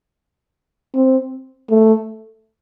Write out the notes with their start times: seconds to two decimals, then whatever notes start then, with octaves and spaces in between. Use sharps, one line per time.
0.95 C4
1.70 A3